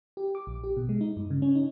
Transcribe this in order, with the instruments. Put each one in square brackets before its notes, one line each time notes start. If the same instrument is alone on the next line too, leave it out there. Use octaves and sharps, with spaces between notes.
[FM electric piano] G4
D6
A#1
G4
B2
G#3
D#4
G2
C#3
C#4
D#4